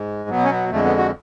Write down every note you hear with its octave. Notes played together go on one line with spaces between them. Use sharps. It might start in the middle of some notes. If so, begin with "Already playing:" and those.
Already playing: G#2 G#3
B2 F#3 B3
C#4
B3
F2 D3 G#3 A3
B3
F#4